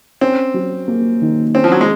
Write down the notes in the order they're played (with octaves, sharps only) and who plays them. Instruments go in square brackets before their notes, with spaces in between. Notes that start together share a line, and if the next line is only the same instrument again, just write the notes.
[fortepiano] C4 [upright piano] C#4
[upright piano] F#3
A#3
D#3
[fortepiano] C4 [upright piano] C#4
[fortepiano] F3
F#3
G#3